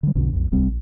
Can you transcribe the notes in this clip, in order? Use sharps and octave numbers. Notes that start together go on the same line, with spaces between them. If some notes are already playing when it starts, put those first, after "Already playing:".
D3 G3
B1 F2 B2 D3
B1 F2
D1 C2 G3 C4
A#1